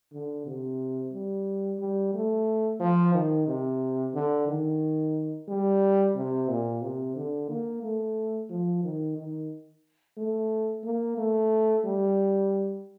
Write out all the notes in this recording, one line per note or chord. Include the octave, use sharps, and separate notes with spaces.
D3
C3
G3
G3
A3
F3
D#3
C3
D3
D#3
G3
C3
A#2
C3
D3
A#3
A3
F3
D#3
D#3
A3
A#3
A3
G3